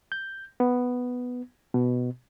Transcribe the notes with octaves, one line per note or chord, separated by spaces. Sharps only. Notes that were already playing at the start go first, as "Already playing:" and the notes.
G6
B3
B2